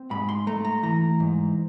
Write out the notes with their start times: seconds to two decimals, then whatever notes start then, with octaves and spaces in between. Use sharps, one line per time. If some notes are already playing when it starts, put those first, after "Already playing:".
Already playing: C4
0.11 G#2 B5
0.29 C6
0.47 A3 A#5
0.65 A#5
0.83 E3 A#5
1.20 G#2